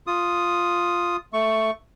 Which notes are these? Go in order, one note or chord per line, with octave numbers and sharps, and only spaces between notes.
F4 D#6
A3 C#6